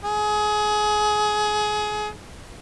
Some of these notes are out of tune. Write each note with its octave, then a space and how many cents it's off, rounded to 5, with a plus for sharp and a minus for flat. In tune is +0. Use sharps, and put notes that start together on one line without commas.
G#4 +25